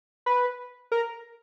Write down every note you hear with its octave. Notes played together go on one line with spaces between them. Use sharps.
B4
A#4